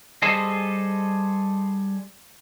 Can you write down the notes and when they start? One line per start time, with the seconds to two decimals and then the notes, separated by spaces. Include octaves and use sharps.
0.22 G3 G#4 A4 C5 D#5